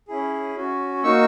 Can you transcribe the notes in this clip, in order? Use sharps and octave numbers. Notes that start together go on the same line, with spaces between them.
C#4 E4 G#4
C#4 F#4
A#3 D#4 F#4 C#6 E6